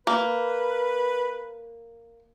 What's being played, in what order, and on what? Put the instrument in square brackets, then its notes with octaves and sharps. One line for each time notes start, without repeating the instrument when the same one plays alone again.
[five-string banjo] A#3 [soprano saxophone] B4